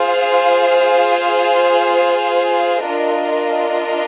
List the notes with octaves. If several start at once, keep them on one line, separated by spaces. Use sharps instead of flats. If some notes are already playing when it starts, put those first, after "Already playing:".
Already playing: F4 G#4 C5 F5
D4 F4 A#4 D#5